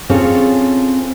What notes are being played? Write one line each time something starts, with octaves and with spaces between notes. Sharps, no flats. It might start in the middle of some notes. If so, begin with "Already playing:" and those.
C4 C#4 F4 G#4 A4 C#5